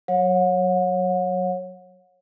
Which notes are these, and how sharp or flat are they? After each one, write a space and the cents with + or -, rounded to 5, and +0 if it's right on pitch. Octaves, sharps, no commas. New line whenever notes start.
F#3 +0 C#5 -15 F#5 -40